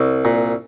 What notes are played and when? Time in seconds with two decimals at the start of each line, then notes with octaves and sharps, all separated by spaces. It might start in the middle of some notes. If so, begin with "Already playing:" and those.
Already playing: C2
0.25 A#2